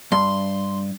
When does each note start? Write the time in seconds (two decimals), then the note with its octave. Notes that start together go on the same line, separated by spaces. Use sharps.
0.12 G2 C6